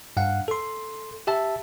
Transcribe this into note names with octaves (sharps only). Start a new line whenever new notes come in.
G2 F5 F#5
A4 C6
G4 E5 A5